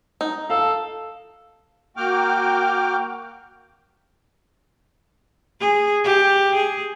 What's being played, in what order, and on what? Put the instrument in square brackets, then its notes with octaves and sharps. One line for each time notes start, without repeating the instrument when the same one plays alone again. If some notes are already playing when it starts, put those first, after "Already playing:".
[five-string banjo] D#4
[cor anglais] A4 [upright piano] F5
[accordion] A#3 F#4 G5 D6 F6
[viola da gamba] G#4
G4
G#4